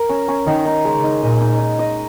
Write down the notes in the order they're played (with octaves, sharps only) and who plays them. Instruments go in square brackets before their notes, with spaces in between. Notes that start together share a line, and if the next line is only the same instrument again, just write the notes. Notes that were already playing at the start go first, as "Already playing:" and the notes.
Already playing: [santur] A#4
C#4
C#4
[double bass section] D#3 [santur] D#4
[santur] D#4
[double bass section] C#3 [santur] G#3
[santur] D#4
[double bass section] A#2 [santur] D#5
[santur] D#4
D#4
D#5